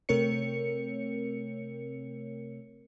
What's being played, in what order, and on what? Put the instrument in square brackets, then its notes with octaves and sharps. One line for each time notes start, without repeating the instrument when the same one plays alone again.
[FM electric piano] C3 A3 C4 A#4 C#5 C#7